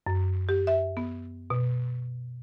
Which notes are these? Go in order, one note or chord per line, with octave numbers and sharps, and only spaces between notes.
F#2
G4
E5
B3
B2